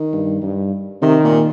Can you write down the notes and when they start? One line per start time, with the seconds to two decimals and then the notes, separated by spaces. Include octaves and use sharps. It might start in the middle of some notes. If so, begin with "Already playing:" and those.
Already playing: D#3
0.13 G2
0.42 G2
1.02 C3 D#3
1.24 A#2